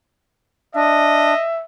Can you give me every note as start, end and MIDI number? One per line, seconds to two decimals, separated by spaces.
0.75 1.34 62
0.75 1.45 75
0.75 1.64 76